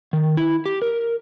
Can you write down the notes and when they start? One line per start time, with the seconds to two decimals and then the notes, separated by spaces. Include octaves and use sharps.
0.13 D#3
0.37 E4
0.66 G4
0.82 A#4